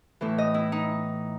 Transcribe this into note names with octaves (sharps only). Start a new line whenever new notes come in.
A2 E3
D#5
E4
D#4